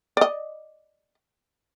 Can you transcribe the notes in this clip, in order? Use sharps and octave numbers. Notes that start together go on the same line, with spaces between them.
D5 D#5